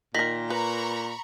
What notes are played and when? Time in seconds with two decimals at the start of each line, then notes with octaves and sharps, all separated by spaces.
0.15 A#2 D#3 A#4 A#6 B6 F#7
0.50 B4 A#5 B5 C#6